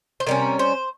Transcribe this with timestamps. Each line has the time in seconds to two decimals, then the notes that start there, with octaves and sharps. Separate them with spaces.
0.20 C5
0.27 C3 G3 C#4 A#4
0.59 C5